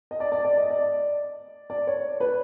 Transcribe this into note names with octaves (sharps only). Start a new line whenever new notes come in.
D#5
D5
D5
D5
D#5
D5
D5
C#5
B4